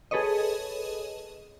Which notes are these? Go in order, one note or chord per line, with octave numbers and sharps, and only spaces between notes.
G#4 A4 B4 C#5 D#5